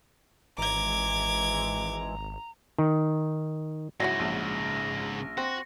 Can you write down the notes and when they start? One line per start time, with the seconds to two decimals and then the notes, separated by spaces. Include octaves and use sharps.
0.58 G#1 E3 G#3 A#5 D6 G#6
2.78 D#3
4.00 G#2 C#3 F#3 E4 F#4 A#6
4.19 A#1
5.38 C4 F#4